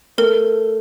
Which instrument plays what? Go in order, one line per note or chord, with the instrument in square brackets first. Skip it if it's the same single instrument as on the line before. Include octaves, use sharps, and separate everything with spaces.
[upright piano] A3 [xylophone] A#4